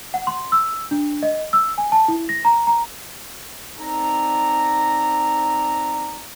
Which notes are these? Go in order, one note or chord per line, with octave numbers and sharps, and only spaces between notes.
F#5
C6
E6
D4
D#5
E6
G#5
A5
E4
A#6
A#5
A#5
C4 D#4 A4 D5 A#5